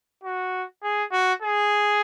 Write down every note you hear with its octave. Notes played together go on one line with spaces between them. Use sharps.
F#4
G#4
F#4
G#4